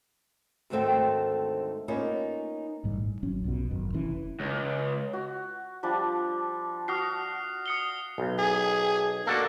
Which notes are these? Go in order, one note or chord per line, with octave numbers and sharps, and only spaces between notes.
D2 G#2 D#3 A3 C4 G5
A#3 B3 C#4 D#4 F4
A1 G#2 G3
G#2
G#1 F#3 C#4
B1 F2 B2
G#1 F#2
F1 E3 C#4
C#2
F#4
F3 G3 D4
F#4 D#6 F6 C7
D#6 C#7 G7
B1
G#4
A#3 D4 F#4 A4